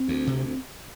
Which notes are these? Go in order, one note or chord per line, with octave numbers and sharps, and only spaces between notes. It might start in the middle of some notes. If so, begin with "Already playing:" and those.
Already playing: C4
D2
C3